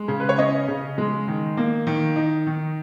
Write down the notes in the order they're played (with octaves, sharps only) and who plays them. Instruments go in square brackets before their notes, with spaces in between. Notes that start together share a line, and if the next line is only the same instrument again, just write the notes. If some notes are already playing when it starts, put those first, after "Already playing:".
Already playing: [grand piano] G#3
C#3
B4
C#5
C#4 D#5
C#3
G#3
D#3
A#3
D#3
D#4
D#3